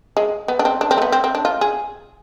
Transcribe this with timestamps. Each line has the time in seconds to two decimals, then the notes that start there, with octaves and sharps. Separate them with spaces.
0.17 G#3
0.48 B3
0.59 D4
0.65 C4
0.81 D4
0.91 C4
0.97 A3
1.02 B3
1.12 C4
1.24 C4
1.35 D4
1.45 F4
1.61 G#4